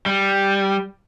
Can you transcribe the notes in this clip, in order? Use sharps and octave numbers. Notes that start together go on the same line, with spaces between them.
G3